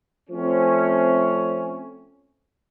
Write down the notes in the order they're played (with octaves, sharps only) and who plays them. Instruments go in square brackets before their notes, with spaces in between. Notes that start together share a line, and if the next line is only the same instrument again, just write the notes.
[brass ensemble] F3 A3 C4 C#4